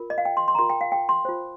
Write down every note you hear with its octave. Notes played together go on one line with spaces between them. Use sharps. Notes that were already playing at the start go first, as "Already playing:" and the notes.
Already playing: F4 A#4
D#5
F5
G5
C6
C6
A#5
F4 A#4 C6
G5
F5
G5
C6
F4 C5